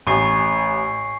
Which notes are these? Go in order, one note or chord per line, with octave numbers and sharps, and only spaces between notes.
A1 G#5 C#6 C7